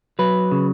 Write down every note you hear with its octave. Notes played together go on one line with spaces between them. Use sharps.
F#3 B4
C#3